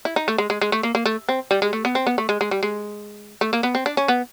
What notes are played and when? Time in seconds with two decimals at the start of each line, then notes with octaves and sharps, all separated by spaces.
0.05 E4
0.16 D#4
0.28 A3
0.38 G#3
0.50 G#3
0.61 G#3
0.72 A3
0.83 A#3
0.95 A#3
1.06 A3
1.29 C4
1.51 G3
1.62 G#3
1.73 A3
1.85 B3
1.95 C4
2.07 B3
2.18 A3
2.29 G#3
2.41 G#3
2.51 G3
2.63 G#3
3.41 A3
3.53 A#3
3.63 B3
3.75 C4
3.86 D4
3.97 C#4
4.08 B3